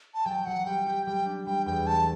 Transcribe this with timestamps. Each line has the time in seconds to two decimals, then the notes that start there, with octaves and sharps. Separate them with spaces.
0.14 A5
0.25 F#3 G5
0.46 F#3 F#5
0.66 G3 G5
0.86 G4
1.06 G3 G5
1.26 D4
1.47 G3 G5
1.66 E2 G5
1.87 A3 A5